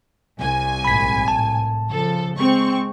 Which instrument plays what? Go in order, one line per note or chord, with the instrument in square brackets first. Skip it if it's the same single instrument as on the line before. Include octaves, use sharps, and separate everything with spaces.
[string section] C2 G#5
[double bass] A#1 G#2 [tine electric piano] B5 B6
[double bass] A2 [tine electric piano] A5
[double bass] C#3 F3 [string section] A4
[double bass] G#3 [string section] C4 C#6